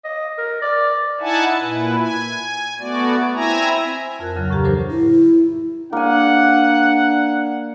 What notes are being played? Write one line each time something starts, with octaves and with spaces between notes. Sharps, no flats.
D#5
A#4
D5
D#4 E4 E5 F#5 G#5 A5
A#2 E4 B4
G#5
A3 B3 F#4 D5
C4 E4 E5 G#5 A#5
F2 F4 A#4 A5 F#6
D2 C#3 F#3
A2 C#3 F3 G4 A#5
E3 F#3 D4 A#4 C5
E4
A#3 D4 F#5 G#5